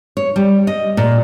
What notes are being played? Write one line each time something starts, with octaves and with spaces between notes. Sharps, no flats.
C#5
G3
D#5
A#2